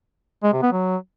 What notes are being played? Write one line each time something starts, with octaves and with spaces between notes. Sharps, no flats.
G#3
C3
B3
F#3